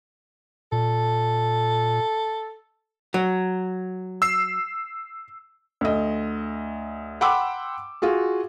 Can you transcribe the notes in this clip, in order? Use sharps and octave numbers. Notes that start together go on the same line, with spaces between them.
A#2 A4
F#3
E6 C7
D2 D#5
F#5 G5 B5 C6 D6 E6
F4 F#4 G#4